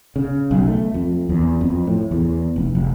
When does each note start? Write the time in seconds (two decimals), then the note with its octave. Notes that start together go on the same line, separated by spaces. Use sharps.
0.16 C#3
0.51 B1
0.68 A3
0.94 F2
1.29 E2
1.61 F2
1.87 A2
2.11 E2
2.56 F1
2.75 F1